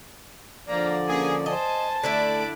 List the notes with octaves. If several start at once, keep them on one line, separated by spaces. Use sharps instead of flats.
D3 F3 A#3 D5 A#5
A#3 C#4 G#4
C5 D#5 G#5 A5
D3 A3 D4 E4 B5 D6